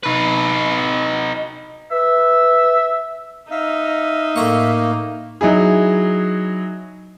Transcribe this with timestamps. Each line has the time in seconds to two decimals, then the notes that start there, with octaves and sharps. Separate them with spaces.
0.03 D#4 B4
1.91 B4 E5
3.51 D#4 E5 F5
4.36 A2 A#3 A#5 C#6
5.41 F#3 D#4 E4 G#4